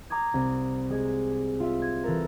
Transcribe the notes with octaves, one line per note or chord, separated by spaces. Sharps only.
A#5 D6 D#6 G#6
C2
G#3 G#4
F4 E5
G#6
E3 A4 A#4